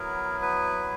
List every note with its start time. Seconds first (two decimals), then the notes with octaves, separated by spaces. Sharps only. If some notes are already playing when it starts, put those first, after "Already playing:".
Already playing: F#3 B3 E4 A#4
0.42 B4